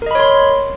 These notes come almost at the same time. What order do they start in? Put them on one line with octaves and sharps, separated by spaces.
A#4 D#5 B5 C#5 C6